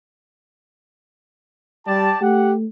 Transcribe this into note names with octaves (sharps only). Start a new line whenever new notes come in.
G3 G4 D5 A5
A3 G4 F#5